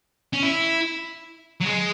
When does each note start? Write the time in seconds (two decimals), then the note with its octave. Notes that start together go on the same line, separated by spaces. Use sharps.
0.33 C#4
0.43 E4
1.60 F#3
1.65 G#3